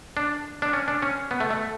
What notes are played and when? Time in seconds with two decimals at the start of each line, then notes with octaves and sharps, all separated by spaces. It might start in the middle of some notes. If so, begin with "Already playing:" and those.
0.17 D4
0.62 D4
0.73 C#4
0.88 D4
1.02 C#4
1.31 B3
1.40 A3
1.51 A3